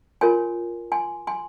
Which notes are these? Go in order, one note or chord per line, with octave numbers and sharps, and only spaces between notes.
F4 A#4 C#5 G#5 C6
G#5 C6
G#5 C6